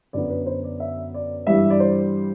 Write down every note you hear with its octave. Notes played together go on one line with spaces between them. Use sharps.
F#2 D3 F#3 B3 D5
B4
C5
D5
E5
D5
G2 E3 G3 E5
D5
C5